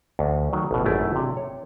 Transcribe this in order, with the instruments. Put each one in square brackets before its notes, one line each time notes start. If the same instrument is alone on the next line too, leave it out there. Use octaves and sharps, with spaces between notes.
[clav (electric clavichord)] D2
D#3 F#3 A3
A1 B2
G#1 F#2 A3 E4 D5
C3 D4
C#5